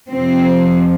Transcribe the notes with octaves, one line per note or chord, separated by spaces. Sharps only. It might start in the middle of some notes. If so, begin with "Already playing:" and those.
F2 C3 F3 C4